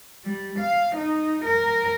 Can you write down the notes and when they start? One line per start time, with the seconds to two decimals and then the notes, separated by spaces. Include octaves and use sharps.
0.24 G3
0.59 F5
0.96 D#4
1.45 A#4